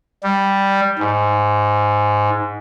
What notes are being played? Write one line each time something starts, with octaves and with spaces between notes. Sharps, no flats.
G3
G#2